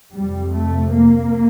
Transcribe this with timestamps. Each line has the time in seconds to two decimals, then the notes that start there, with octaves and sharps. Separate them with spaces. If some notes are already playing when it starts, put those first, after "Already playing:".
0.15 F2 C3 G3
0.54 A3
0.94 A#3